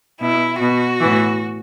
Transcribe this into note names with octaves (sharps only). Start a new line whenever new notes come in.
B2 E4
B2 F#4
A2 E3